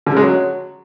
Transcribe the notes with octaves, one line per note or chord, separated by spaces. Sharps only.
D3
C#3
G#3
F#3